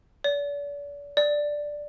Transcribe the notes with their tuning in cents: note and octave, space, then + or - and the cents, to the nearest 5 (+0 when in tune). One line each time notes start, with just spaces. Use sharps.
D5 -40
D5 +0